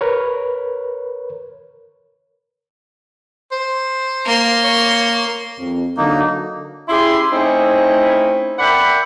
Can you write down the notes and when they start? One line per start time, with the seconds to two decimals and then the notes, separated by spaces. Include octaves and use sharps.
0.01 A#4 B4 C#5
3.52 C5
4.25 A#3 C6
4.64 C#5
5.57 F2
5.97 D3 F#3 A#3 D#4
6.89 C#4 E4 G4 G#4 C6
7.31 A3 C4 C#4 D#4 E4 G#4
8.59 A#4 D5 E5 F#5 G5 B5